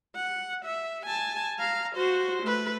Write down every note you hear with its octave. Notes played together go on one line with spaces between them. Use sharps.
F#5
E5
G#5 A5
F5 A#5
F#4 C5
A3 B4